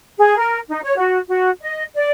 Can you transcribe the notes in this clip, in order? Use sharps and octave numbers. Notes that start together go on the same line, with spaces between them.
G#4
A#4
D#4
C#5
F#4
F#4
D#5
D5